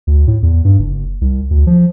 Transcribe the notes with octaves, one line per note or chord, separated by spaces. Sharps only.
D2
A2
E2
G2
F#1
C2
D2
F3